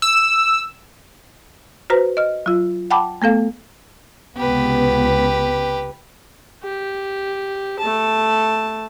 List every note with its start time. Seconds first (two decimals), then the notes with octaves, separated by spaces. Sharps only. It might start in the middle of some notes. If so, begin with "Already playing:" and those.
0.02 E6
1.90 F#4 B4 C5 A#5
2.17 D#5 F6
2.46 F#3 F4
2.91 F#5 G5 A5 B5 D6
3.22 A3 B3 A4 F5
4.37 C#2 C3 B3 G4 B4
6.63 G4
7.79 A3 A5